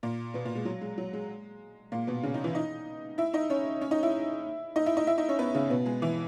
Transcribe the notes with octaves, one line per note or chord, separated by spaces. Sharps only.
A#2 A#3
B2 B3
A#2 A#3
G#3
F#3
G#3
F#3
G#3
A#2 A#3
B2 B3
C#3 C#4
D#3 D#4
E3 E4
D#4 D#5
E4 E5
D#4 D#5
C#4 C#5
C#4 C#5
D#4 D#5
E4 E5
D#4 D#5
E4 E5
D#4 D#5
E4 E5
D#4 D#5
C#4 C#5
B3 B4
C#3 C#4
B2 B3
G#3 G#4
E3 E4